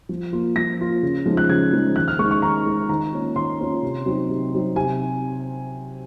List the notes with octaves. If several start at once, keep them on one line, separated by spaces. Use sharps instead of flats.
F3
A#3 F4
F3 A#6
A#3 F4
C#3
F3 G#3 D#4
F#6
C#3 G#6
F3 G#3 D#4
D#3 F#6
F6
G#3 D#4 C#6
C#6
D#3 A#5
G#3 D#4
D#3 A#5
A#3 C#4 F4
D#3 C6
A#3 C#4 F4
C3
F#3 C4 D#4
C3
F#3 C4 D#4
C3 G#5